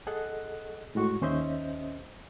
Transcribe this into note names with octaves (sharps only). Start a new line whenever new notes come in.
G#4 A4 D#5 F#5 F#6
A2 G#3 F#4 C#6
D#2 C#4 C5 D#5 E5 G6